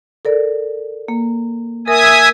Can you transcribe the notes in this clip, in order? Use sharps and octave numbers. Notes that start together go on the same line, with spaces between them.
A4 A#4 D5
A#3
A#4 E5 G#5 D#6